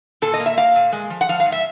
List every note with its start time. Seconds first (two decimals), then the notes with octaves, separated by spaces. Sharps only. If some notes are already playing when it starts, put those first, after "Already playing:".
0.22 A#2 A4
0.34 D#5
0.40 A#3
0.46 E5
0.57 A#3 F5
0.75 A#2
0.92 G#3
1.10 F3
1.21 F#5
1.29 F3 F5
1.40 F5
1.46 G#2
1.52 E5